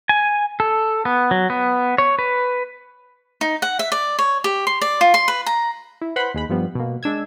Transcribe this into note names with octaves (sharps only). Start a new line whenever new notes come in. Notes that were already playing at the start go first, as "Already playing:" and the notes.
G#5
A4
B3
F#3
B3
C#5
B4
D#4
F#5
E5
D5
C#5
G4
C6
D5
F4
C6
B4
A#5
E4
B4 C5 F#5 B5 C6
D#2 G#3 B5
G2 F3 G3 B3
B2 A#3
G#3 D4 E6 G#6